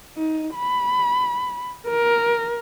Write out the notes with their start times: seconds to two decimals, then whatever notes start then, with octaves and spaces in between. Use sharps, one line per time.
0.16 D#4
0.55 B5
1.88 A#4